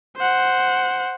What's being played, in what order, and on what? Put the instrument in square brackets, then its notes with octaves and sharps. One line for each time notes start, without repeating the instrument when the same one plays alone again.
[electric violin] C5 F#5